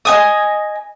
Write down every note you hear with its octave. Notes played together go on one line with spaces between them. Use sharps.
D#5 G#5 D#6